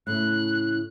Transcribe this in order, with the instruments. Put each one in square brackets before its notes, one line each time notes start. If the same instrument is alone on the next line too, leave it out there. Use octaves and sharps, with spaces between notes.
[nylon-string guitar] A2 C#3 E4 [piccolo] F#6